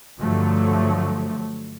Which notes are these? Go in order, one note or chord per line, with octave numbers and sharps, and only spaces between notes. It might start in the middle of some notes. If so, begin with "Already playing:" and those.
G2 D3 F3 F#3 A3